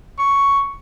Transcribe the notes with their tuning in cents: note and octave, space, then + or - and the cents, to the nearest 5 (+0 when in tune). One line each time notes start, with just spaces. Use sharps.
C#6 +5